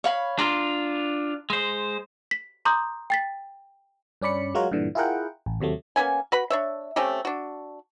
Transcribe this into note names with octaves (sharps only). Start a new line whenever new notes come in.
C#5 F5 B5
D4 F4 A#5 C6
G#3 C5
B6
A#5 C6 D6 D#6 G6
G5 A6 B6
G2 C#4 D5 B5 C#7
F#3 G#3 F4 F#4 A#4 C#5
G2 A#2 D3 E3
E4 F4 G#4 A#4 F#5 G5
A1
D#2 C3 F#3 A3
A#3 B3 C#4 G#5
F#4 B4 B5
D4 C#5 E5
A3 C4 C#4 G4
D4 F#4